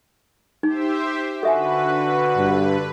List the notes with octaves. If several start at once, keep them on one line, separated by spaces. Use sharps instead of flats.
D#4 G4 C5 E5
D3 F#4 A4 B4 E5 G#5
G2